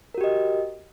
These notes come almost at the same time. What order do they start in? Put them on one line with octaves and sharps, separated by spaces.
A#4 F#4 G4 D#5